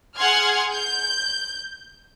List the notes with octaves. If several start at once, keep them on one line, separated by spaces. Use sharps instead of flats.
G#4 F#5 G#5 C6 F6 G#6
G6